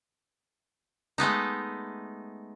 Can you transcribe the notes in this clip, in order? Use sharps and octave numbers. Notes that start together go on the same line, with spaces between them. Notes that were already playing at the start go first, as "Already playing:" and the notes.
G#3 A3 B3 D#4